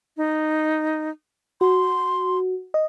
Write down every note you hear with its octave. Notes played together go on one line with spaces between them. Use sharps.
D#4
F#4 C6
D#5